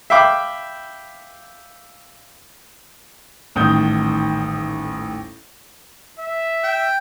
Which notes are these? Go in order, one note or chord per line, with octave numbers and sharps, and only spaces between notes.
E5 F5 G5 B5 D6
D#1 A1 D#3 D#6 G6 G7
E5
G5